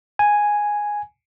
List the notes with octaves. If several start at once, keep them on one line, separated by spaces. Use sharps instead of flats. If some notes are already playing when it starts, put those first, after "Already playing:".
G#5